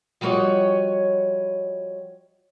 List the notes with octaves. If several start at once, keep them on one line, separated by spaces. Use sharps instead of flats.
F3 G3 F#4 A4 C#5 D#5